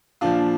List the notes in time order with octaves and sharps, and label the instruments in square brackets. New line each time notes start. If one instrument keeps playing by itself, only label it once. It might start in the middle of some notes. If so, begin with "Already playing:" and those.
[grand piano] A#2 F3 D4 F4